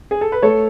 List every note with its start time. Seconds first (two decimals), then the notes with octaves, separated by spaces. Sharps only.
0.11 G#4
0.21 A4
0.32 B4
0.42 A3 A4 C#5